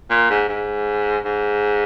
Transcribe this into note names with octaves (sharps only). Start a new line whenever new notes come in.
A#2
G#2
G#2
G#2